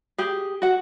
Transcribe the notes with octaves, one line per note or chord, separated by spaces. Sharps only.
G4 G#4
F#4 F#5